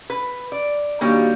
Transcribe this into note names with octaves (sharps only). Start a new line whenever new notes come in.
B4
D5
D#3 G3 A#3 D4 F#4 G4 C#5 F5